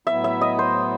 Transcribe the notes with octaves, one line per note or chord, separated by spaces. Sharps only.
A2 F#3 B3 E4 E5
E5
D#5
C5